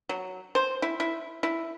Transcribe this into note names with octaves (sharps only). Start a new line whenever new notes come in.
F#3
C5
E4
E4
E4